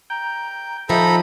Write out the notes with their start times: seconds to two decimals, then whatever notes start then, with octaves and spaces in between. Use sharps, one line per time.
0.10 G5 A#5
0.89 D#3 F3 A4 E5 A#5 B5